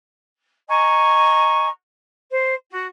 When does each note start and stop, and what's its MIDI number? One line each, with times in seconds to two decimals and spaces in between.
0.68 1.67 75
0.68 1.67 80
0.68 1.67 82
0.68 1.67 85
2.30 2.55 72
2.69 2.84 66